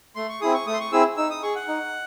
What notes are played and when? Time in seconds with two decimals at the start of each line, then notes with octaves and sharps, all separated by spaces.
0.16 A3 C6
0.29 C#6
0.41 C4 E4 G#4 D#6
0.54 C#6
0.66 A3 D#6
0.73 C6
0.80 C#6
0.92 C4 E4 G#4 E6
1.17 D#4 E6
1.30 D#6
1.43 G#4 C#6
1.56 F#5
1.68 D#4